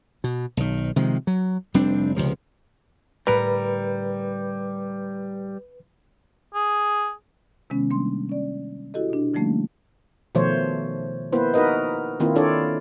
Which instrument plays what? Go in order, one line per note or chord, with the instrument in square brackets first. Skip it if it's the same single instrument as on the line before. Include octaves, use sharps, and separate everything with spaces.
[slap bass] B2
B1 D#3
C3 D#3 F3 G#3
F#3
F1 G3 C4 D4
C#2 C3 F3
[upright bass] A2 D3 [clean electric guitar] G3 A#4 [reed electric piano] B4
[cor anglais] G#4
[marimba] C3 D#3 G#3 B3 C#4
G3 A#3 D4 C6
C#4 D5
E4 F#4 G4 A4 D#5
B2 D4
D3 F3 G3 A3 A#3 C#4
[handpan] B2 D#3 F3 A3 C5 C#5
A#3 B3 E4 B4 C5
D#4 F#4 A#4 B4 D#5
D#3 A#3 C4 E4 F4
D4 E4 F4 A4 C#5 D5